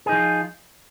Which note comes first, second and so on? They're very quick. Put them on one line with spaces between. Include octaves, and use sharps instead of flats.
G#4 D#4 F3 F4